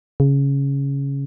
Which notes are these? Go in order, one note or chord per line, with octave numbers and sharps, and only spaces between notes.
C#3